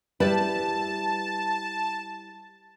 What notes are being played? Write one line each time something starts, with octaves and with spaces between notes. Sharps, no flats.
G3 E4 B4 A5